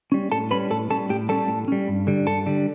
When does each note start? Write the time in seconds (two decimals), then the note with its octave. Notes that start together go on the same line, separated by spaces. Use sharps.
0.12 G3 C#4
0.32 A2 A4 A5
0.51 G3 C#4 B4 B5
0.71 A2 A4 A5
0.90 G3 C#4 A4 A5
1.09 A2 G4 G5
1.29 G3 C#4 A4 A5
1.48 A2
1.68 G3 C#4
1.88 G2
2.07 D3 G3
2.27 G2 A4 A5
2.46 D3 G3